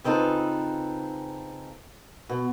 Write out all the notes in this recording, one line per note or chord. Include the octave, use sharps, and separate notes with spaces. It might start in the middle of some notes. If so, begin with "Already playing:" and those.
C#3 C4 D#4 F4 A4 B4
B2